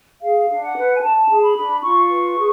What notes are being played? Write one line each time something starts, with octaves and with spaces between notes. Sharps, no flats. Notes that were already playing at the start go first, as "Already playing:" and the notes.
G#4 F5
D4
F#5
B4
G#5
D4 A5
G#4
B5
D4
F4 C#6
B4
G#4